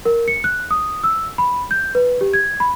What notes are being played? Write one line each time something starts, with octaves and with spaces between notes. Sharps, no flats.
A#4
C#7
F#6
D#6
E6
B5
G6
B4
G4
G#6
B5